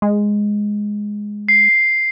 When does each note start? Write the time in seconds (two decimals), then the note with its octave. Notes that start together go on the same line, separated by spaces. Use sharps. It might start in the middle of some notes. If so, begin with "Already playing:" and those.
0.02 G#3
1.49 C7